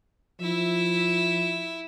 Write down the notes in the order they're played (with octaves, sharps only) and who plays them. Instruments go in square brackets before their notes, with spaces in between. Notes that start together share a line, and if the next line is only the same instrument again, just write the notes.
[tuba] F3 [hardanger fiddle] E4 E5